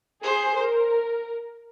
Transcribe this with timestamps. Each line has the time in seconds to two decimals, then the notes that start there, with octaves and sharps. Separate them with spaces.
0.23 G#4 C5
0.57 A#4